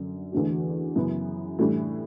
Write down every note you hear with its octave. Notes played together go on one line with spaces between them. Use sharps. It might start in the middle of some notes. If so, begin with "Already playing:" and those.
Already playing: F#2 D3
E2 D3 A3 D4 F#4
F#2 C#3 E3 B3
A2 E3 G3 D4